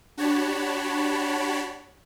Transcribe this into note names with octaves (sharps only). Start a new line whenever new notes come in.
D4 F#4 G4 C#5 A5 B5